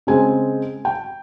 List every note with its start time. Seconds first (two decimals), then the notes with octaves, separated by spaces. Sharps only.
0.07 C#3 G#3 C4 G#5
0.85 G5